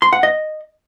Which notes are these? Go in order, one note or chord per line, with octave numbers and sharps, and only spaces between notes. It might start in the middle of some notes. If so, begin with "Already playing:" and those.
C6
F#5
D#5